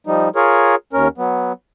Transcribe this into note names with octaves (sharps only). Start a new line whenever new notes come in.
F3 G3 D#4
F4 G#4 A#4 C#5
D#2 C#4 A#4
F#3 B3